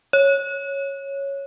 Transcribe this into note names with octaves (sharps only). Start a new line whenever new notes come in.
C#5